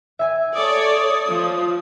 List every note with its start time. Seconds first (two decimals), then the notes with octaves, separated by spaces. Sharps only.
0.19 E5 G#5
0.54 A4 C#5 D5 D#6
1.28 F3